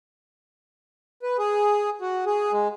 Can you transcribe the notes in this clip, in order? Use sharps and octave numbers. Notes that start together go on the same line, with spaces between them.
B4
G#4
F#4
G#4
G#3